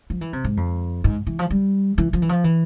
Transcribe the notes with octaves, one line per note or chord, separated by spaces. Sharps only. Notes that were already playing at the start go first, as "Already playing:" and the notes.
F3
E3
C3
G#2
F2
G#2
E3
F3
G3
E3
F3
E3
F3
E3